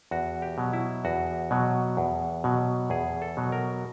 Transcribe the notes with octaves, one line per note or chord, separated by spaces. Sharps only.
E2 F#4
G4
B2 F#3
E4
E2 F#4
B2 F#3
E2
B2 F#3
E2 G#4
A4
B2 F#3
A#4